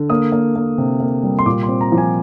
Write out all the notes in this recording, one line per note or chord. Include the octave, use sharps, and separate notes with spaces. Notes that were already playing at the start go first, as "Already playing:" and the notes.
Already playing: D3
A#3 D#6
A#3
A#3
C3
A#3
G3
C6
A#2 D6
C6
C4
A#5
F3
G#5